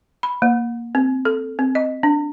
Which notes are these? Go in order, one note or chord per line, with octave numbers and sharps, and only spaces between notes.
B5
A#3
C4
A4
C4
D#5
D4